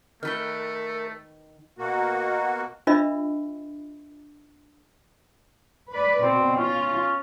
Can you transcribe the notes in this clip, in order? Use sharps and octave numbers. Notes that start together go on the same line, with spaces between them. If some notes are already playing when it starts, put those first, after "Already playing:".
D#3 A3 A#4 B4 G5
B2 A#3 F#4
D4 F4 A#4 D#5 E5 B5
B4 D5
B2 C4
C#4 F4